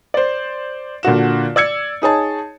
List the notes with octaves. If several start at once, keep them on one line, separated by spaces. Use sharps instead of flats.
C5 D5
A#2 D3 F#4 E7
D5 E6 G#6 C#7
D#4 G#4 C#5 A5